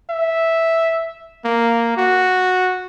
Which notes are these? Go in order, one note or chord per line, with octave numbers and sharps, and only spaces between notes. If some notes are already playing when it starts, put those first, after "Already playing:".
E5
A#3
F#4